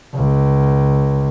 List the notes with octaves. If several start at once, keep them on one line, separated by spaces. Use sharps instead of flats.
C#2